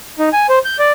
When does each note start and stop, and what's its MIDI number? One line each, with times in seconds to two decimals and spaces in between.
0.19 0.29 63
0.33 0.47 80
0.49 0.59 72
0.65 0.77 91
0.79 0.92 74